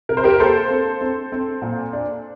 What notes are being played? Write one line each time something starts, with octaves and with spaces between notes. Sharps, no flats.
C3 A#4
C5
G4 A#4
A#3 A4 C5
C4
C4
C4
A#2
D4